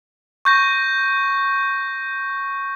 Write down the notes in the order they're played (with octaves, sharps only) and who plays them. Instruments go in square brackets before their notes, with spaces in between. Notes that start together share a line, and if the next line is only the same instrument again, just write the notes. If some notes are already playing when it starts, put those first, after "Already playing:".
[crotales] C#6 G6 A#6